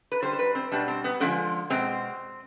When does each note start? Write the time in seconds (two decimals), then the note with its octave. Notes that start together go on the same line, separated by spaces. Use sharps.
0.12 B4
0.22 D3 G3 C5
0.33 C5
0.39 B4
0.55 C4
0.72 B2 G3 D4
0.88 C4
1.04 B3
1.20 D3 F3 G#3 C4
1.70 B2 G#3 C4